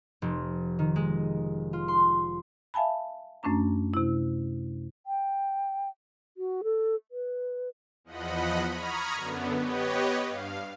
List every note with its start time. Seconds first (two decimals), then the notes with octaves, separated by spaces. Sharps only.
0.22 F1
0.79 D#3
0.96 G#3
1.73 F4
1.88 C6
2.74 E5 F5 G#5 A5 B5
3.43 F#2 A3 C#4 D4 A#5
3.94 C3 E4
5.07 G5
6.37 F#4
6.64 A4
7.12 B4
8.04 E2 F3 D#5 F#5 B5
8.69 A#5 B5 C#6 D#6 F6 G#6
9.13 F#2 D3 B3
9.55 B3 G4 B4 C#5 D#5
10.24 G2 F5